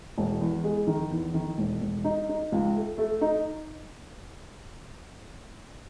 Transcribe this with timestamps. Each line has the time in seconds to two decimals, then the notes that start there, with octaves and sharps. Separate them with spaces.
0.18 E1
0.41 E2
0.64 G#3
0.87 D#3
1.11 E2
1.34 D#3
1.58 E1
1.81 E1
2.04 D#4
2.29 D#4
2.52 C#2
2.75 A3
2.98 A3
3.21 D#4